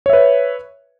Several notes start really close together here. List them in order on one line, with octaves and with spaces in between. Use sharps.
C#5 E5 B4